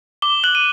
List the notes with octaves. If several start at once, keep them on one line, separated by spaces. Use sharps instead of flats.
D6 G7
F#6 F#7
D#7